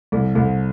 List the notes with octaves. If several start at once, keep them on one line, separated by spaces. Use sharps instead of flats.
C2 A4
C2 A4